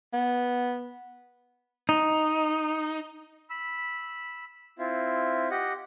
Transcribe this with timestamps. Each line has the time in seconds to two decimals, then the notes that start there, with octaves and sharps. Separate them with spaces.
0.13 B3
1.89 D#4
3.50 B5 E6
4.79 C4 E4 F4
5.50 G4 D#5 F#5